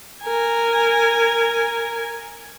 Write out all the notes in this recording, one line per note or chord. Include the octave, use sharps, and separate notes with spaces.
A#4 G#5